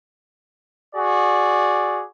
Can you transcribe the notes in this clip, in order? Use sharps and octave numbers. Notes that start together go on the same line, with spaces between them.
F#4 G#4 D5